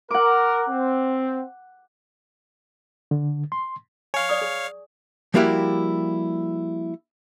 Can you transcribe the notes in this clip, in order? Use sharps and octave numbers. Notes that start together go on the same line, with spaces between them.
A#4 F#5 D6
C4
D3
C6
C#5 F5 G#5 C#6
D5 D6 D#6
G#4
F3 G3 A#3 E4 F#4 G4